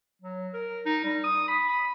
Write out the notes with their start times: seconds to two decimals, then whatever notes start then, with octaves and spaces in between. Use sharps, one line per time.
0.22 F#3
0.54 A#4
0.86 D#4
1.05 G3
1.24 D#6
1.48 B5
1.69 B5